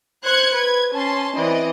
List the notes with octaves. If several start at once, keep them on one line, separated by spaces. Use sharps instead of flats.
C5 F#6 G#6 C#7
B4 G#6
C#4 A5 C6
E3 C4 D5 D#5